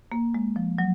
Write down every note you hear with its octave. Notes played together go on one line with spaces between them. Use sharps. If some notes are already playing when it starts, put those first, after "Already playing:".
A#3
G#3
F3
F#3